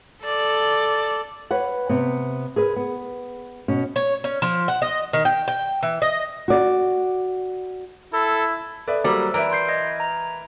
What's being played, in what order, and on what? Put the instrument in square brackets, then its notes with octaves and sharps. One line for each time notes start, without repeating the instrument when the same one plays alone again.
[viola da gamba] A4 [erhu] D5
[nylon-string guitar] B4 C#5 F#5
C3 B3
G#4 A#4 B4
B3
B2 C#4
[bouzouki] C#5
C#4
F3
F#5
D#5
D#3
G5
G5
E3
D#5
[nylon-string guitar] F#4 D5
[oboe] E4 [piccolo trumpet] A4
[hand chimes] A4 [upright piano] B4 D5 E5
[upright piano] F#3 A#3 [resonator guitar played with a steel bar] G3 [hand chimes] C5 E6
[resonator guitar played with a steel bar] E3 [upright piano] A#4 B4 E5 [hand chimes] D5 D7
[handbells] C6 G6 C7
[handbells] D#5 [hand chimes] G#6
[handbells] A#5